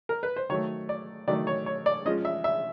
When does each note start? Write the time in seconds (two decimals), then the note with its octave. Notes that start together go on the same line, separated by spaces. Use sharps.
0.09 A#4
0.23 B4
0.36 C5
0.50 D#3 F#3 A3 C#5
0.89 D5
1.28 D#3 F#3 A3 D5
1.47 C#5
1.66 C#5
1.86 D5
2.06 F3 G#3 C#4 D#5
2.25 E5
2.44 E5